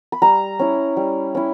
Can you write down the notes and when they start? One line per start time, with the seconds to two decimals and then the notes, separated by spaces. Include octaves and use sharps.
0.12 B5
0.22 G3 A#5
0.59 C#4 E4
0.97 G3
1.35 C#4 E4